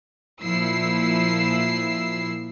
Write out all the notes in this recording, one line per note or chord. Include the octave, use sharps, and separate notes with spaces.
A#2 F3 E4 E6 C7